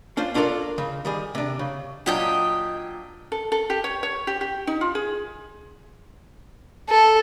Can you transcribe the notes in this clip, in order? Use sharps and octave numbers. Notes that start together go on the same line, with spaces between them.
C#4 D4 F4 C5
C#4 D4 F4 A4 A#4 D5
C#3
D#3 G3 G#4
C3 D4
C#3
A#2 F#3 D4 G4 D#5 G5
A4
A4
G4
C#5
C#5
G4
G4
D#4
F4
G#4
A4